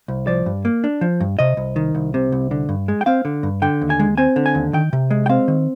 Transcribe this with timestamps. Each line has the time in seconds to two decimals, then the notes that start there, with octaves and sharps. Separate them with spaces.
0.08 C2
0.27 F3 D5
0.46 G2
0.65 A#3
0.84 D4
1.01 F3
1.20 G2
1.39 C3 D#5
1.57 C2
1.76 D#3
1.95 C2
2.14 C3
2.32 C2
2.51 D3
2.69 G2
2.88 G#3
3.01 G5
3.06 C4 F5
3.25 D3
3.43 G2
3.62 D3 G5
3.81 D#2
3.90 G#5
3.99 G#3
4.17 C4 G#5
4.36 D3
4.46 G#5
4.55 D#2
4.73 D#3 G5
4.93 C3
5.11 G#3
5.26 G5
5.29 C4 F5
5.48 D#3